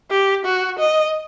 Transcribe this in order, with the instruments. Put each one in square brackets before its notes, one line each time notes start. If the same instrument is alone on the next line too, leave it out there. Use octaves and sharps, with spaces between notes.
[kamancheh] G4
F#4
D#5